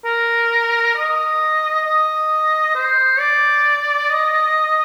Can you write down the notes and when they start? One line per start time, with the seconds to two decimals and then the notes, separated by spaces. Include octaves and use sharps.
0.05 A#4
0.95 D#5
1.84 D#5
2.75 C5
3.19 D5
4.10 D#5